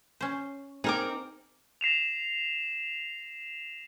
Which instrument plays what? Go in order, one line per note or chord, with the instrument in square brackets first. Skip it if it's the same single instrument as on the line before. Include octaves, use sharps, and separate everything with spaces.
[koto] C#4 C5
[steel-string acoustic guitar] C4 [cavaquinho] D#4 A#4 D6 [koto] G#4
[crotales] A#6 C7 E7 F7